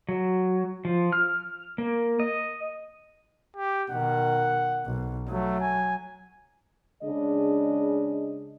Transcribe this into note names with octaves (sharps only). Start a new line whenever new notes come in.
F#3
F3
F6
A#3
D#5
G4
B2 D#3 F#5
B1
F#3 A3
G#5
C#3 G#3 D4 D#5